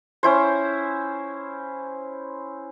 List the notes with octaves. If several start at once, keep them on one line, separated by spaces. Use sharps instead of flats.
C#4 E4 C5